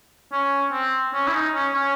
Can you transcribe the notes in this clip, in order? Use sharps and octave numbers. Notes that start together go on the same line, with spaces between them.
C#4
C4
C#4
E4
D#4
C#4
C#4